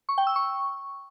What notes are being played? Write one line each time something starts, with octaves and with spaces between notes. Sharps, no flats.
C#6
G5
E6
C#6